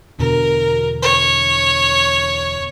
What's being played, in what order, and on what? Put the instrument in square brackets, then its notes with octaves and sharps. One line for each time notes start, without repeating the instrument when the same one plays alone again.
[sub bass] E2 [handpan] B2 D3 [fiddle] A#4
[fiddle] C#5